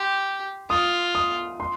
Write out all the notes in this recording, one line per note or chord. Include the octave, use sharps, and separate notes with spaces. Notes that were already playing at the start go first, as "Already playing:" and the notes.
Already playing: G4 C6
F4 D#6
D#6
C6